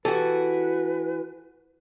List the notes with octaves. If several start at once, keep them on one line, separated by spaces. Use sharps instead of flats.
E3 F#4 G4 A4 B4